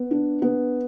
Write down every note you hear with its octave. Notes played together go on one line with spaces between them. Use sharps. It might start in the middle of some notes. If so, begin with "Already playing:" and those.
Already playing: B3
D4
B3